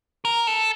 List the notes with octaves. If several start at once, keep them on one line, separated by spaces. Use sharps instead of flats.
A#4
A4